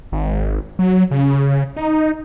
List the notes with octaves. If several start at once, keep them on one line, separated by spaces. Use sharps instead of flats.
G#1
F#3
C#3
D#4